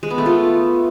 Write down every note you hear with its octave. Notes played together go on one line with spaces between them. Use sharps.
G#3
B3
A3
F4